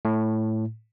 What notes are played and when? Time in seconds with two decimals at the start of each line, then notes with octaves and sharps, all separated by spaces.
0.05 A2